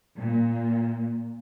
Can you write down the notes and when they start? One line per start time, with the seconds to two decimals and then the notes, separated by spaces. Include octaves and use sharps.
0.18 A#2